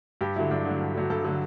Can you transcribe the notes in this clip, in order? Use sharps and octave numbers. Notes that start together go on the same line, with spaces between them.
G2 G4
D3 F#3 E4
G2 D4
D3
F#3
G2
D3 F#3
G2 A4
D3 F#3